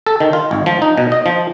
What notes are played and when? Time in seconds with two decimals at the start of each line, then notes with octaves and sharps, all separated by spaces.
0.07 A4
0.20 D#3
0.33 F4
0.51 G#1
0.66 F3
0.82 D#4
0.98 B2
1.12 D#5
1.26 F3